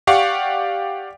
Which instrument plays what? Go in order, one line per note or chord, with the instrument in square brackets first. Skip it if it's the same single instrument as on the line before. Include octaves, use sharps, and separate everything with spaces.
[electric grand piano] G4 D5 F5 F#5 C#6